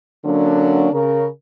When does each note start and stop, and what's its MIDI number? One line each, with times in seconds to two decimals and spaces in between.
0.25 0.89 50
0.25 0.89 54
0.25 0.89 58
0.25 0.89 61
0.25 0.89 62
0.93 1.26 49
0.93 1.26 70